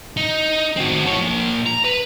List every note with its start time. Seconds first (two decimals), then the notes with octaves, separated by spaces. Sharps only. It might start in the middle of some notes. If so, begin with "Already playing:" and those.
0.17 D#4
0.77 C4 F#4
1.06 A4 C#5
1.18 F3 A#3
1.66 A#5
1.84 B4